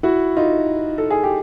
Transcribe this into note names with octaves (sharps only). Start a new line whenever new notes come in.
E4 F#4
D#4 F4
A4
G#4
G4